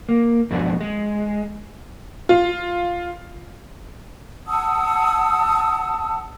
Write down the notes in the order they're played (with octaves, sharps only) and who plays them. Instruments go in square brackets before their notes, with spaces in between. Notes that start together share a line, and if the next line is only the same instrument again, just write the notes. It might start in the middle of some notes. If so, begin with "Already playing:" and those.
[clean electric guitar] A#3
F2 G#2 B2 D4
G#3
[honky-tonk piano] F4
[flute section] F#5 A5 D#6 E6